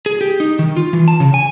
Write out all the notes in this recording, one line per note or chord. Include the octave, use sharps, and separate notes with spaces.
G#4
G4
D#4
D#3
F4
E3
A5
C#3
G#5